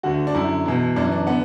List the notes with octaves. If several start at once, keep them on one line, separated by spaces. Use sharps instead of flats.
D2 D3 F#4
D4
F#2 D3 E4
E2 B2
F#2 E3 D4
D4
D3 B3